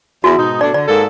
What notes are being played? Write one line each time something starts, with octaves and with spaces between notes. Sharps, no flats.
E2 E4 F#4
G#2 B2 D#4
B2 A3 D4 D5
D3 D5
G#2 A#3 A4